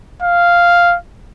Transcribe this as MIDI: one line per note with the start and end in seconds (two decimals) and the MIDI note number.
0.22 0.96 77